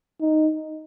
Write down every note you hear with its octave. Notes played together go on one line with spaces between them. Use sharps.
D#4